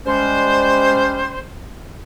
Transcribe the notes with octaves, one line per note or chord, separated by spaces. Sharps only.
G3 G#3 C#4 C5